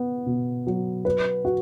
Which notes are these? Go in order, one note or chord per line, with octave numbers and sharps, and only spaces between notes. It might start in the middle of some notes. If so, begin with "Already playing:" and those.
Already playing: B3
B2
F#3
B4
F#4